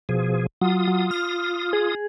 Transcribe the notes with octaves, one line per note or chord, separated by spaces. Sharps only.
B2 F3 G#4
F#3 F4 D#6
F#3
F6
G#4